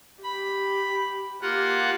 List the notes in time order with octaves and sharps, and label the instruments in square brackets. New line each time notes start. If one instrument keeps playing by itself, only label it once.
[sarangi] G4 [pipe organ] B5
[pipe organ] A#3 F4 F#5 [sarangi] G4